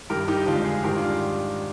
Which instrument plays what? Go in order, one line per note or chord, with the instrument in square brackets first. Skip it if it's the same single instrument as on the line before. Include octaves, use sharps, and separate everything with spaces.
[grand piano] G2 D#3 G3 G4 A#4
D#4 G4
F2 D3 F3 G#3 D4 F4
F4 G#4
G#2 D#3 G3 G4 A#4
D4 F4